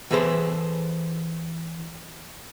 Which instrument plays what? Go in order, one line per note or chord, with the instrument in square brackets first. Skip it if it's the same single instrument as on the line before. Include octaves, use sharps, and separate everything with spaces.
[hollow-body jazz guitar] E3 G#4 A4 B4 C5